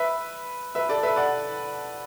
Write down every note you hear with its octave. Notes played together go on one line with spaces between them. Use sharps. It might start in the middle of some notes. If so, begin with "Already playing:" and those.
Already playing: B4 E5
B4 E5
A4 D5
B4 E5
D5 F#5